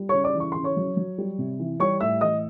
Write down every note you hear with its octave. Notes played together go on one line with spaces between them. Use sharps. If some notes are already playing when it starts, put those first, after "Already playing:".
Already playing: G3
C#3 C#5 C#6
D5 D6
E3
C#6
C#3 C6
C#5 C#6
F#3
F#3
G3
C3
E3
G3 C#5 C#6
A2 E5 E6
E3 D#5 D#6